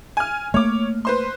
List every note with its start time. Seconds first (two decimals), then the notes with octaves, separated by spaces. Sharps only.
0.17 G#5 F6
0.54 A3 A#3 C#5 D6
1.05 B4 C5 C6